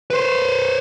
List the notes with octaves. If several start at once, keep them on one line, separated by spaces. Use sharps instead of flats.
B4 C5